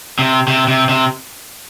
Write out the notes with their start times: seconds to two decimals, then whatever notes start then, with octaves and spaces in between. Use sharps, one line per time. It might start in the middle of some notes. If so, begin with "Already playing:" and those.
0.19 C3
0.48 C3
0.68 C3
0.89 C3